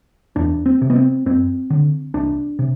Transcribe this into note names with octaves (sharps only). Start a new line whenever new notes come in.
E2 D4
C4
C3
B3
C4
F#2 C4
D3
C2 D4
C3